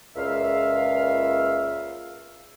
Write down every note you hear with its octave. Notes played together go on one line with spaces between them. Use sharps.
C#2 A#2 E5 F5